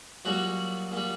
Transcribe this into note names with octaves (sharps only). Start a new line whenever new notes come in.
A#2 F#3 G3 F#4
A#2
G3